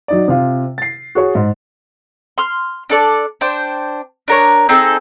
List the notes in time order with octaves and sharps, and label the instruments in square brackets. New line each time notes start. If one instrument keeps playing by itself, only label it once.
[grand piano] F#3 D#4 D5
C3 F4
A6 C7
F#4 G#4 C#5
G#2
[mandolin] C6 F6
D4 A4 D5
D4 C5 G5
D4 A#4 C#5
C4 D#4 G#4 A4